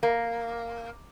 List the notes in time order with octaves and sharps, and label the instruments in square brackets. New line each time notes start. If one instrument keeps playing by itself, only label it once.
[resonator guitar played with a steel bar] A#3